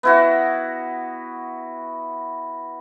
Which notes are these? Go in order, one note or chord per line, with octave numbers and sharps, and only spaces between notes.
B3 E4 F#4